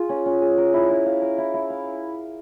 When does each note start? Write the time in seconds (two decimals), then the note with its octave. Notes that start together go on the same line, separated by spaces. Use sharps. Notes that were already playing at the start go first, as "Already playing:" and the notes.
Already playing: F4 G#4
0.09 C#4
0.26 C#4
0.42 G#4
0.58 A#4
0.74 E4
0.90 E4
1.06 F5
1.22 A#4
1.38 E4
1.54 E4
1.70 F5